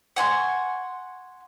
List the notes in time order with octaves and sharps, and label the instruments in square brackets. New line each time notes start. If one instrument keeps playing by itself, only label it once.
[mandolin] F#5 G#5 C6 C#6